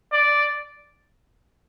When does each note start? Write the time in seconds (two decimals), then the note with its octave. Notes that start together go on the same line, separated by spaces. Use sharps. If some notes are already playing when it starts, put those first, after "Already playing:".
0.13 D5